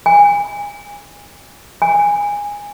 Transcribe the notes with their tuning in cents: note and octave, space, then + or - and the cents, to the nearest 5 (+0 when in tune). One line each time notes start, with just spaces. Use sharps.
G#5 -30
G#5 -20